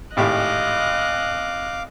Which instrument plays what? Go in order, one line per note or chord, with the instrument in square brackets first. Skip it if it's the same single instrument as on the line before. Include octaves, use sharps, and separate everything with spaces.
[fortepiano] G#1 A2 G4 [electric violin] D#5 F#6 [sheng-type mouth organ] F5 D6